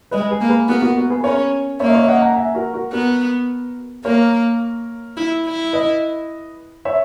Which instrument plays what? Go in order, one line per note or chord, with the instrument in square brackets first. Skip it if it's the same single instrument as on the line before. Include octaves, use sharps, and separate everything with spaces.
[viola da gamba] G#3 [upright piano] B4 D#5
[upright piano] G#4 B4
[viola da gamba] A#3
[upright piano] G#4 B4
[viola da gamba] B3 [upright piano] F#4 A#4
[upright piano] F#4 A#4
F#4 A#4
G#4 B4
[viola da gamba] C#4 [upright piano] A#4 C#5
[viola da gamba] A#3 [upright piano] C#5 E5
[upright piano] D#5
C#5 E5
D#5 F#5
F#5 A#5
E5 G#5
F#4 A#4
F#4 A#4
[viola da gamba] B3 [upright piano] F#4 A#4
[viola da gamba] A#3 [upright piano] A#4 C#5
[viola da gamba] E4
E4
[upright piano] B4 D#5
C#5 E5